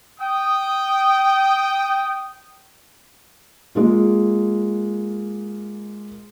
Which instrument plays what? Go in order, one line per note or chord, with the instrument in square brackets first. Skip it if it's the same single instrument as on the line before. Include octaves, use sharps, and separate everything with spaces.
[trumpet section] G5 D#6
[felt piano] G#3 A#3 F4